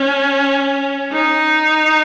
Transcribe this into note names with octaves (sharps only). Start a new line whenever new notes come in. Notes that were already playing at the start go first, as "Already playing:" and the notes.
Already playing: C#4
D#4